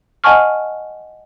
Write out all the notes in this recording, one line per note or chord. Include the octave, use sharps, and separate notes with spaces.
D#5 F#5 G#5 A5 C#6 F6